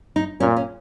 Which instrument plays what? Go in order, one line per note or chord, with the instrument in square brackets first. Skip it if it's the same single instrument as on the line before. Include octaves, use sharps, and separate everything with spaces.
[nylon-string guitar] D#4
[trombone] A#2 [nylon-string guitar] C#4
[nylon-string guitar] C#4